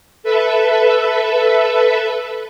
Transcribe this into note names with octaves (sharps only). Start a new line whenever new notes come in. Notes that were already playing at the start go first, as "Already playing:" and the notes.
A4 B4 E5